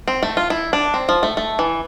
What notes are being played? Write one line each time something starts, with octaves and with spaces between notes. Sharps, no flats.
C4
A3
F4
E4
D4
C4
F3
A3
A3
E3